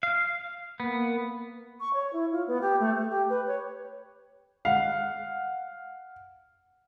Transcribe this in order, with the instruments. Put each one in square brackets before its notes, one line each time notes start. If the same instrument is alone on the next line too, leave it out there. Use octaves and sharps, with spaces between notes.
[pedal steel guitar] F5
[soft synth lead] A#3 [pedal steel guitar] B3
[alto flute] C#6
C#5
E4
F4
B3
G4
A3
A4
G4
B4
C#5
[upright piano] F5 F#5